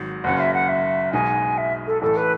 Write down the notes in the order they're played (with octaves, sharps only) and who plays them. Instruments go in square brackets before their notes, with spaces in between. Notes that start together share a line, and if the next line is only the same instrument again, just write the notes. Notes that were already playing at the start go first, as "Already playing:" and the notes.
Already playing: [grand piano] G#1 G#2 D#3 F#3
[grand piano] F#1 F#2 C#3 [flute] F#5
[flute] E5
F#5
E5
[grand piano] B1 B2 G#3 D#4 [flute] G#5
[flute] E5
A4
[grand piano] A1 A2 E3 A3 [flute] A4
[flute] B4